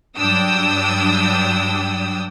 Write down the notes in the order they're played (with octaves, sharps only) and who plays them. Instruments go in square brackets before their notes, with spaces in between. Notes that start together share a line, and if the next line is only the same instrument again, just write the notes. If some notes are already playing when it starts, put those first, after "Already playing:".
[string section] G2 F#3 D4 G5 D#6 E6